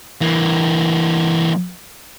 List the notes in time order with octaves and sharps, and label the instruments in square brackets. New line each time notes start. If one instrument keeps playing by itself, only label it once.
[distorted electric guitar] E3 A#3